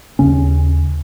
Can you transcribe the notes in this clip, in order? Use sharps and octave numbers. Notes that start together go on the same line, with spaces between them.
D#2 C#3 C#4